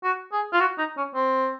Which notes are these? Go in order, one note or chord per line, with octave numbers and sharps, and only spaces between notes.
F#4
G#4
F4
F#4
D#4
C#4
C4